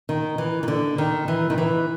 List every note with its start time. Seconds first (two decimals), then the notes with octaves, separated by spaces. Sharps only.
0.09 D#3
0.38 E3
0.63 D#3
0.68 D3
0.98 D#3
1.28 E3
1.50 D#3
1.58 E3